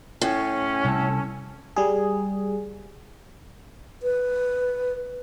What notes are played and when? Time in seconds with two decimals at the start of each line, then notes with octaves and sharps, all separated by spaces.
0.21 A2 C#4
0.85 C2 A4
1.76 G3 G#4
4.03 B4